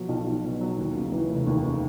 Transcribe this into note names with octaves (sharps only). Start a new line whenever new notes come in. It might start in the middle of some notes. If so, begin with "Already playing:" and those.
Already playing: B2 F3 F#3
B1
B1
B2
F#3
D#2
C#3
E3
F1
D#2
C#3